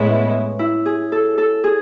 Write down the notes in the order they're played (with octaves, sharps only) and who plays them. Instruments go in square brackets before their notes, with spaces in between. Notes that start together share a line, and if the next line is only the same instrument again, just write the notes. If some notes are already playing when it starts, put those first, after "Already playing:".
Already playing: [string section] A2 G#3 B3 E4 [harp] C#4
[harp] E4
G#4
A4
A4
G#4